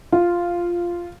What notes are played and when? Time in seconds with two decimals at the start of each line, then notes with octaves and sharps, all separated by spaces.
0.12 F4